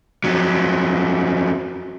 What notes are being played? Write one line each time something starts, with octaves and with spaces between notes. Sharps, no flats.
F2 F#3